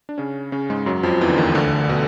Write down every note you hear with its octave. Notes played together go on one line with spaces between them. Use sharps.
D4
C#3 C#4
C#3 C#4
G#2 G#3
F#2 F#3
F2 F3
E2 E3
D3
D#2 D#3
D2 D3
B2